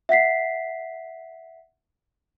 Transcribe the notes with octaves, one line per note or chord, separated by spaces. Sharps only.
E5 F#5 B6 C7